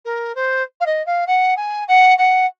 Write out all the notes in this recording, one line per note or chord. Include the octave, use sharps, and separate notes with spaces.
A#4
C5
F5
D#5
F5
F#5
G#5
F#5
F#5